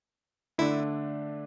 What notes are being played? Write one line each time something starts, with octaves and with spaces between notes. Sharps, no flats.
D3 A3 D4 E4